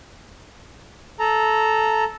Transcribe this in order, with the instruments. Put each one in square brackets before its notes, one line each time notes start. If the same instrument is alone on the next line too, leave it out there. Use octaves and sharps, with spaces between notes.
[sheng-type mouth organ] A4 A#5